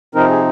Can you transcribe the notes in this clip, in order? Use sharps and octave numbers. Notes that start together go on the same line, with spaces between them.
C3 F3 C4 D#4 A#4
G#4